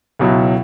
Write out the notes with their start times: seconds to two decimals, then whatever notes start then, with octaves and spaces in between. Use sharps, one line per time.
0.19 C#2 B2 F#3 C#4 E4